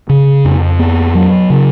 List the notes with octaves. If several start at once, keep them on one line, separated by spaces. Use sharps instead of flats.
C#3
F2
B3
F#3
C#3